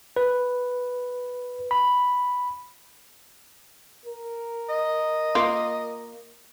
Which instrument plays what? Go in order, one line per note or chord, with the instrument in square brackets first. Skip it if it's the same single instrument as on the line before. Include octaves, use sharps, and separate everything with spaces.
[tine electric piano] B4
B5
[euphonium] A#4
[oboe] D#5
[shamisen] A#3 F4